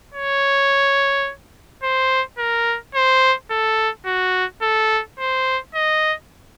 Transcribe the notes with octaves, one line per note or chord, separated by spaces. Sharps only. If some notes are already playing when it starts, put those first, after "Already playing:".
C#5
C5
A#4
C5
A4
F#4
A4
C5
D#5